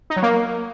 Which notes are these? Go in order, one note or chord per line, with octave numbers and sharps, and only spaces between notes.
D#4
F#3
A#3